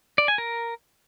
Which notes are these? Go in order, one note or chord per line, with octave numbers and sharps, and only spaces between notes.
D5
G#5
A#4